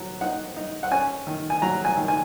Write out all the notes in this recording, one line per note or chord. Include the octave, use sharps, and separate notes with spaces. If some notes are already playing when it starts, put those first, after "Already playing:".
Already playing: F#3
D#4 F#5
D#4
F#5
C#4 G#5
D#3
G#5
F#3 A#5
G#5
D#3
G#5